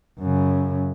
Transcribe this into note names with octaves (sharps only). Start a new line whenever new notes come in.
F#2 C#3